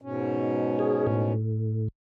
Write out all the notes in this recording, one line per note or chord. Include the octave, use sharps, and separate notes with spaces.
G#2 B2 C#4
G#4
A2